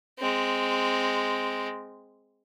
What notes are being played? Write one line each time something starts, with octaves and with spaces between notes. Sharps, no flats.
G#3 C4